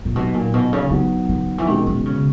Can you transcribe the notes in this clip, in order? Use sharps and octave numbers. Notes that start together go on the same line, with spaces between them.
A#2
B2 F#3 B3 D#4
A#2
B2
C#3
D#3 F#3 B3 D#4
D#3
E3
B2 D#3 G#3 C#4
D#3
C#3